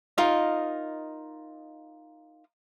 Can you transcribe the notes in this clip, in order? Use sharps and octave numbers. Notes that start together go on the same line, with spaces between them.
D#4 F4 A#4 D#5